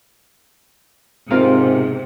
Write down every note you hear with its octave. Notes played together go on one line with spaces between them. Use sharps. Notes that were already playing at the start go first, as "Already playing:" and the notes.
G#2 C3 C4 F4 A#4 F5